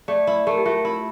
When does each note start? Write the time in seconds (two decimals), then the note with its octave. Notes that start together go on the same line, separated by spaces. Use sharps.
0.08 A3 D5
0.27 E4
0.47 A3 A#4
0.58 G4
0.65 A3 F4
0.85 E4